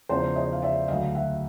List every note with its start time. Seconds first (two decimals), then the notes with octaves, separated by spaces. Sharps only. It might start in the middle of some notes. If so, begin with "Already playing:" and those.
0.09 E2 C#3 F3 C5 D5
0.36 C#5 D#5
0.53 F5
0.62 D5 E5
0.88 D2 D3 F#3 D#5 F5
1.15 E5 F#5